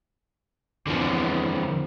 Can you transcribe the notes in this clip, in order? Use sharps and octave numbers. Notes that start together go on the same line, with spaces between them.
E2 D3 F3 C4